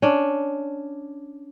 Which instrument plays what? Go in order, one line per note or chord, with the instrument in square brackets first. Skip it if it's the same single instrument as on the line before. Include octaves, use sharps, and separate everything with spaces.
[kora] C#4 D4